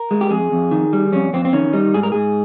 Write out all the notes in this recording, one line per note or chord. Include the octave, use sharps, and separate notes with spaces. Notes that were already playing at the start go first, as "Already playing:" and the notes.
Already playing: A#4
G#3
G4
F2 G#4
F2
D#3
G3
F2 C#4
F2 C4
C4
D#3 C#4
G3 D#4
G#2 G#4
A#4
G#2 G#4